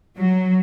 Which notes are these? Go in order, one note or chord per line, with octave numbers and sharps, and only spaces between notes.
F#3